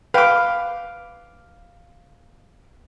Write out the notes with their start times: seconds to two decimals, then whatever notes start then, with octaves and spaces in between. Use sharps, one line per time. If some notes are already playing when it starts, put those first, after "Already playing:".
0.14 B4 F5 G5 D6